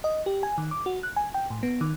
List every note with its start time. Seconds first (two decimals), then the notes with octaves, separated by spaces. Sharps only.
0.04 D#5
0.26 G4
0.43 G#5
0.58 D#3
0.71 D6
0.86 F#4
1.03 F#6
1.16 G#5
1.34 G5
1.50 A2
1.63 B3
1.81 D#3